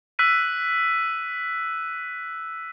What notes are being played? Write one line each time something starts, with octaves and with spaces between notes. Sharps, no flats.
E6 F#6 B6 D#7